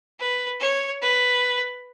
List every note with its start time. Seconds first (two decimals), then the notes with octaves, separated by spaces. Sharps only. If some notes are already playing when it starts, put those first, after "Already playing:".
0.20 B4
0.61 C#5
1.02 B4